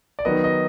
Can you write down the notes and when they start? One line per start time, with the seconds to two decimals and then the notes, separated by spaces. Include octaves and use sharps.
0.19 D5
0.25 D#3 F#3 B3 D#5
0.44 D#5